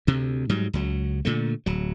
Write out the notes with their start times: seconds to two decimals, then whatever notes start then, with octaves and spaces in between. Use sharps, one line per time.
0.07 D2 C3
0.50 G#2 F#3 G3
0.73 C#2 F#3
1.25 A#2 D3 A3
1.66 D1 F#3